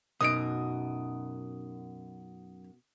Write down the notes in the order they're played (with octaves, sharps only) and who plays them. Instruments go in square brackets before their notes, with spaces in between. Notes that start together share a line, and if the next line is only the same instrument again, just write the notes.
[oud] F#2 D#4 [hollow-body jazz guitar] B2 [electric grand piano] D#6 D7